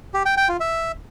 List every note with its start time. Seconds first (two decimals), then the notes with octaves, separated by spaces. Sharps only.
0.14 G4
0.26 G5
0.37 G5
0.49 F4
0.60 E5